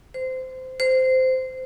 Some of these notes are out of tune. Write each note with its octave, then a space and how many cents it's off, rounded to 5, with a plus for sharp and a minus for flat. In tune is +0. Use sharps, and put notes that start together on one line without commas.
C5 -20
C5 -15